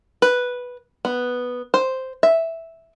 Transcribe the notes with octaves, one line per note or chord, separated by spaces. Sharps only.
B4
B3
C5
E5